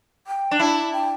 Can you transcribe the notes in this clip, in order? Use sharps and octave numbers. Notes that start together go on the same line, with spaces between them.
G5
D4
E4 A5
G5